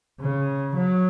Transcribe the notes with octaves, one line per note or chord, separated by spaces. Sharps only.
C#3
F#3